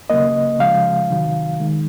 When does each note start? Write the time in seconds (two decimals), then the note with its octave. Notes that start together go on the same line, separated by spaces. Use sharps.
0.10 C#3 F#3 A#3 D#5
0.59 C#3 F3 G#3 F5
1.09 C3 D#3 F#3
1.60 D#3 G#3